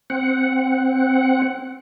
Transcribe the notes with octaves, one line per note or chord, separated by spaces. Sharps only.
C4 F#5